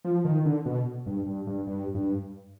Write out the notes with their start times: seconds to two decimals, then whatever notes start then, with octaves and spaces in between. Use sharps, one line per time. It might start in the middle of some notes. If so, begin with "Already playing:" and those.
0.05 F3
0.25 D#3
0.45 D3
0.65 B2
1.06 G2
1.27 G2
1.47 G2
1.67 G2
1.95 G2